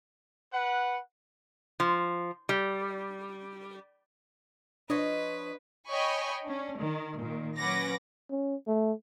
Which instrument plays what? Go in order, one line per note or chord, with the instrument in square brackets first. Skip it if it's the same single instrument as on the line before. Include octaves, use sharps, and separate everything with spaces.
[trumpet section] B4 F#5
[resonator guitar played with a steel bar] F3
G3
[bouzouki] F3 C#5 D#5 [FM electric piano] D4 [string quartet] B4
[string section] C#5 D#5 G5 G#5 B5 C#6
C#4 D4
D#3
A#2 D#3
F#3 C#4 B4 F#5 D6 A#6
[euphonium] C#4
A3